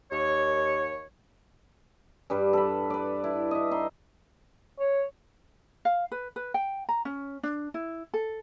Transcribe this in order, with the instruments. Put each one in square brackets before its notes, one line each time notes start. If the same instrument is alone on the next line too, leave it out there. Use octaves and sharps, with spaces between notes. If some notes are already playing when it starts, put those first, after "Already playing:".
[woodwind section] D#2 C#5
[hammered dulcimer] G2 G3 B4
A4 B5
B4 D5
E4
D#5 E5
D#4 C6
[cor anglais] C#5
[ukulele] F5
B4
B4
G5
A#5
C#4
D4
E4
A4